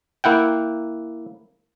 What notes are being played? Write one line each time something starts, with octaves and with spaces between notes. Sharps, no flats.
A#3 E4 F#5 G5